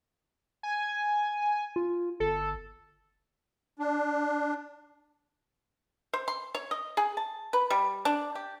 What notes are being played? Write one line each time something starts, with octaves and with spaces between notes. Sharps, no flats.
G#5
F4
G1 A4
D4
C5
C6
C#5
D#5
G#4
A5
B4
G3
D4
G4